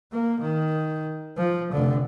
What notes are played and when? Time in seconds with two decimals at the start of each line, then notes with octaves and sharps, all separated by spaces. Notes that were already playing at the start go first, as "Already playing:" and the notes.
0.12 A#3
0.41 D#3
1.38 F3
1.72 F1 D3